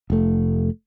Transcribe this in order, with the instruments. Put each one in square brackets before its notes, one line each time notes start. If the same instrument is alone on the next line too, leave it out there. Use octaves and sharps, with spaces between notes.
[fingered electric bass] F1 A3